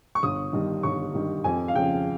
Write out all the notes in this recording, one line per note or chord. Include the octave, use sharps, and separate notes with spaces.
C#6
G1 D#6
G2 D#3
G1 C#6
G2 D#3
F2 G#5
F5
C#3 F3 G5